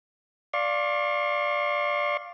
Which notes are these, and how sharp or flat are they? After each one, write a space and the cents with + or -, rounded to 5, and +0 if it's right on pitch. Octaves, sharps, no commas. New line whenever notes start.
D5 +0 F5 +0 C#6 -45